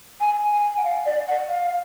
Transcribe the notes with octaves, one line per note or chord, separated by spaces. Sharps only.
G#5
G#5
F#5
F5
D5
F#5
F5